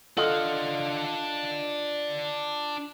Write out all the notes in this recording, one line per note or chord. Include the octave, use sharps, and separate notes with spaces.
D4 F4 A4 D#5 F#5